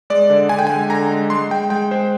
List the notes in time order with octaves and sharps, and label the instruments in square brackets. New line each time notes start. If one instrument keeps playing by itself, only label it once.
[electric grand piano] G#3 D5
D3
D3 G#5
G5
G#3 G#5
D3 A#5
G#3
G#3 C6
G#3 G5
G#3 G5
G#3 C5